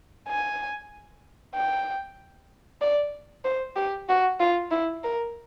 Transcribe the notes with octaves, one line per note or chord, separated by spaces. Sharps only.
G#5
G5
D5
C5
G4
F#4
F4
E4
A#4